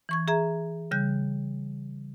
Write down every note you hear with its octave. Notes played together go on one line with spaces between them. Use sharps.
E3 C#6 G#6
G#4 E5 A#5 G#6
C#3 G3 F#6 G6